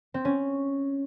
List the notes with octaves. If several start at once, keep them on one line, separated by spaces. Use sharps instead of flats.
C4
C#4